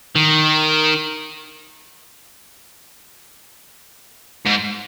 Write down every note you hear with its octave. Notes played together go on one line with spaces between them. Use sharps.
D#3
G#2